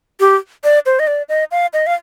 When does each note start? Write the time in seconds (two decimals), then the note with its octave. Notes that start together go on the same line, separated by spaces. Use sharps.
0.20 G4
0.64 D5
0.86 C5
0.99 D#5
1.07 D5
1.29 D#5
1.51 F5
1.73 D#5
1.87 F5